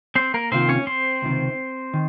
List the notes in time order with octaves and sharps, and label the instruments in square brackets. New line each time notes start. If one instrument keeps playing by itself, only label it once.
[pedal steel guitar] C4 C5
A#3 A#4
[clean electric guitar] C2 C3 D#3 A#3 F4 [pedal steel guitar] C4 C5
[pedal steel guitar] C#4 C#5
C4 C5
[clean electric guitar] C#2 C3 D#3
D#3